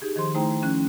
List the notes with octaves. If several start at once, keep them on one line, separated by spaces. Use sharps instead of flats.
D#4 G4 G#4
D#3 F3 C5 C6
A3 D#4 E4 C5 G5 A#5
F3 C#4 F#6